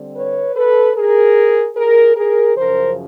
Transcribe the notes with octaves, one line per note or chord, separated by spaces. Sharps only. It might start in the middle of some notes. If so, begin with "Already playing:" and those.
Already playing: D3 G3 C4
B4 C#5
A4 B4
G#4 A#4
G#4 A#4
G#4 A#4
F#2 C#3 F3 A#4 C5